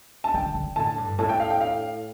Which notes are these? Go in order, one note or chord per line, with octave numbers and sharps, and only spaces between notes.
A5
D3 G5
D3
A2 A5
G2
A2 A5
G5
F5
G5
F5